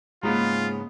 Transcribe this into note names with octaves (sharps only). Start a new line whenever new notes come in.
G#2 C#3 G#3 A#3 B3 F4